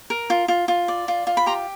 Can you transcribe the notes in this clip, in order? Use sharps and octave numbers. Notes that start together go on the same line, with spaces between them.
A#4
F4
F4
F4
D5
F4
F4
B5
G4 A#5 C6